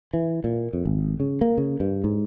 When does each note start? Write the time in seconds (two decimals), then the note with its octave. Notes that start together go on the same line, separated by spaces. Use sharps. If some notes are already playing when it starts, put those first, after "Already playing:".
0.14 E3
0.44 A#2
0.73 F2
0.85 G#1
1.20 C#3
1.41 A#3
1.58 C#3
1.80 G2
2.04 G#2